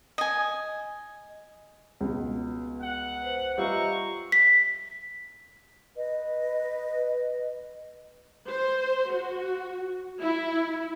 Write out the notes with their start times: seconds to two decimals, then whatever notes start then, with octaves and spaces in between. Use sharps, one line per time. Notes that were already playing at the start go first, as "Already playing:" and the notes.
0.18 D#5 G#5
2.01 C#2 B2
2.81 F#5
3.22 B4 C5
3.58 G3 F4 C5 D#5 E5 A#5 C#6 E6
4.32 B6
5.96 B4 D#5
8.48 C5
9.12 F#4
10.21 E4